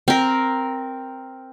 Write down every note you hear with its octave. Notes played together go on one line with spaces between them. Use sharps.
C4 A#4